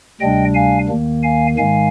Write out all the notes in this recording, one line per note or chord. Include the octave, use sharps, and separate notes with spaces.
D2 C3 G3 D4 D#5 G5
F5 G#5
D#2 D#3 A#3
F5 G#5
G#2 D#3 G#3 F5 G#5